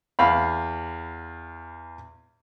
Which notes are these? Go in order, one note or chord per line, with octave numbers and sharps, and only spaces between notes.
E2 F5 B5